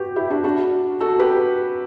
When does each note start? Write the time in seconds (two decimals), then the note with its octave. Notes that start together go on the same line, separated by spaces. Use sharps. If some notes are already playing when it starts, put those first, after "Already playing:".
Already playing: F#4 G4 B4
0.16 E4 G4
0.30 D4 F#4
0.44 D4 F#4
1.00 F#4 A4
1.19 G4 B4